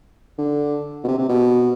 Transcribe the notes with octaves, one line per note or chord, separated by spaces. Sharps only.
D3
B2
C3
C3
B2